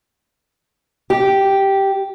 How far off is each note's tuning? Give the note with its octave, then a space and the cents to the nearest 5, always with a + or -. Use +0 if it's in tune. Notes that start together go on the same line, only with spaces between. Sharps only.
G4 -5